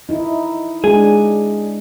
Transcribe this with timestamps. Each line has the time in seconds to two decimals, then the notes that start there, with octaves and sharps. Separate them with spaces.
0.09 D#4 E4
0.84 G#3 D4 G#4